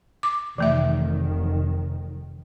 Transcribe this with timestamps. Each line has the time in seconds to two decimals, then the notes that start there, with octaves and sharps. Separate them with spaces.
0.23 D6
0.58 F1 D#3 E3 A3 E5